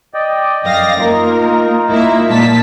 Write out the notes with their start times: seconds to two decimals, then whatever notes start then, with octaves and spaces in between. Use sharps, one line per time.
0.14 D5 D#5 G5
0.64 F#2 F5 A#6
0.99 A#3 D#4 F4 A#4
1.89 A#3 E4 E5
2.29 A#2 A5 B6